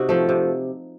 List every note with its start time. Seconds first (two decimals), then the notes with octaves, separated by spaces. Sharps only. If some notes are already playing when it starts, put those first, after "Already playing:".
Already playing: C3 D#4 F#4
0.09 F3 A3
0.29 C3